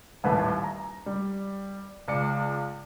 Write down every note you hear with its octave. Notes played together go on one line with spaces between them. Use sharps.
D#1 A1 D#2 B4 E5 A5
A#5
G3
C#2 D5 C#7